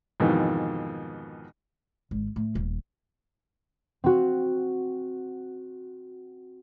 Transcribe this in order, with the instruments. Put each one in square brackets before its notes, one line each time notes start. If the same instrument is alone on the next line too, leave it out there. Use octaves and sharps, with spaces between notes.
[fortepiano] F2 G#2 B2 D#3 E3
[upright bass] G#1
A2
D#1
[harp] C4 F#4